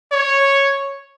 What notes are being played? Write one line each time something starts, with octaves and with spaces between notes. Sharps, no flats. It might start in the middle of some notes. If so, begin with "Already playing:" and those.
C#5